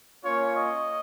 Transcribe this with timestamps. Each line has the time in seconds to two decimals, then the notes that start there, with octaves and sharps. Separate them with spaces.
0.24 A#3 C#4 F4 C#5
0.56 D#5